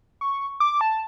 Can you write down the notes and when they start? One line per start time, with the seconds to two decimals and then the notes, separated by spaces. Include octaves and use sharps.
0.21 C#6
0.60 D6
0.81 A5